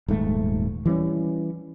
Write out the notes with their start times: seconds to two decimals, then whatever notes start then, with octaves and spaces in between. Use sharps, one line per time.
0.08 D#1 G#2 A3
0.86 E3 G3 C4 C#4